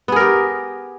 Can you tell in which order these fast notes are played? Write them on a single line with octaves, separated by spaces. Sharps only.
B3 G#4 A#4 G4